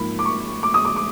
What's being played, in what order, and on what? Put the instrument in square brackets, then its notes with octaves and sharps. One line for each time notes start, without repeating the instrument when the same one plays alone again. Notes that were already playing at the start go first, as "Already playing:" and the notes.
Already playing: [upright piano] G#2 F3 A#3 B5
D6
C#6
D6
D#6
D6
D6